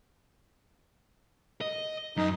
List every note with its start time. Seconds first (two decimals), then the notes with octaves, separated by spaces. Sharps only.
1.61 D#5
2.17 F#2 D#4